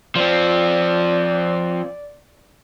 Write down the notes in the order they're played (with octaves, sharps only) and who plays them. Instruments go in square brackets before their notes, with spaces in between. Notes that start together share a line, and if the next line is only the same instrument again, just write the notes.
[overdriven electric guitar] F3 C4 [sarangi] D5